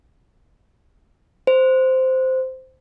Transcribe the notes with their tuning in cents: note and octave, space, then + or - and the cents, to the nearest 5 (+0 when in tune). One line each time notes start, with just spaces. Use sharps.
C5 -10